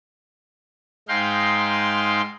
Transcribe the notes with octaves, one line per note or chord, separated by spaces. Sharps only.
G#2 G#3 D#4 F5 G5 C6